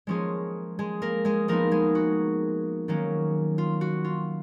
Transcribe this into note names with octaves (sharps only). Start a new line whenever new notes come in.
F3 G#3 A#3 C#4 G#4
G#3 G#4
A#3 A#4
G#3 G#4
F3 A#3 B3 D#4 A#4
G#3 G#4
F#4
D#3 F#3 A#3 C#4
F4
F#4
F4